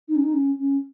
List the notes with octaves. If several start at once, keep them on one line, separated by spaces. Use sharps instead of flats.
D#4
C#4
D#4
C#4
C#4